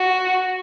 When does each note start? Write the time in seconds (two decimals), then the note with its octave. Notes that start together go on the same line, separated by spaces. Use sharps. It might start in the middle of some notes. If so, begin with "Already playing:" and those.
Already playing: F#4